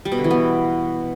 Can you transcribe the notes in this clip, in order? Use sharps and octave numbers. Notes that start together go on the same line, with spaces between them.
G3
B2
D3
E3
B3